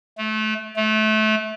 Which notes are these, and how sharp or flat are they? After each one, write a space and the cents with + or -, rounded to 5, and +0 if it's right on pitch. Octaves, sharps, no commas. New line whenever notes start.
A3 -25
A3 -25